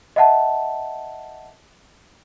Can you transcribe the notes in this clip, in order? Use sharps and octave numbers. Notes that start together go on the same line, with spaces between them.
D#5 E5 F#5 A5